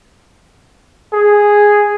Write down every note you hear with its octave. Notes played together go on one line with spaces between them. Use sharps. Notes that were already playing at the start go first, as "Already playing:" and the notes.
G#4